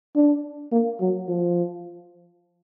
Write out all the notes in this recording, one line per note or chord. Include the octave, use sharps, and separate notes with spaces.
D4
A#3
F#3
F3